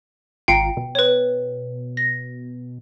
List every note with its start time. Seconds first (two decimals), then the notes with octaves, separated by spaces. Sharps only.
0.48 G#1 F4 G5 A#5 C7 C#7
0.77 B2
0.95 B4 C#5
1.97 A#6